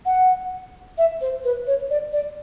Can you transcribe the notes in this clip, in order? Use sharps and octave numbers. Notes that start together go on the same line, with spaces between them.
F#5
E5
C5
B4
C#5
D5
D5